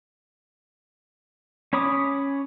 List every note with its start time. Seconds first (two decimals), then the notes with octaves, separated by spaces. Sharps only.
1.73 C#4 C#5 B5 D6 D#6